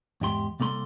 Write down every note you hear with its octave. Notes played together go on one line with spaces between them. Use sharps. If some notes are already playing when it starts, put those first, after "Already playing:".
E2 G#2 G4 C6
C2 A#3 A4 B5 C6